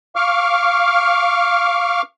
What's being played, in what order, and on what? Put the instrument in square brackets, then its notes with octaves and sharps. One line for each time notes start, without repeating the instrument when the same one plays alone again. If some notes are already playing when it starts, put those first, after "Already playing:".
[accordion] F5 C#6 D6 F6